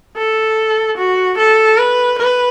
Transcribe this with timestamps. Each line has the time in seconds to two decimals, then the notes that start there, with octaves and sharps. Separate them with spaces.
0.17 A4
0.98 F#4
1.38 A4
1.78 B4
2.19 B4